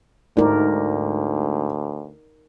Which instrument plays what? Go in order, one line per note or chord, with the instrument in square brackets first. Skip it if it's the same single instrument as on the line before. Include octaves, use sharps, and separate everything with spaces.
[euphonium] D2 [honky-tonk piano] G#2 [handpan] D#4 A#4 D5